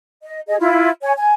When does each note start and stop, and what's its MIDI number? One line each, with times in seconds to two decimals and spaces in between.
0.22 0.41 75
0.47 0.57 68
0.47 0.57 75
0.59 0.90 64
0.59 0.90 65
1.02 1.12 73
1.02 1.12 80
1.17 1.34 80